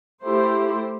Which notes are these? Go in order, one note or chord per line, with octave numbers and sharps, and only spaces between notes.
A3 E4 G4 C5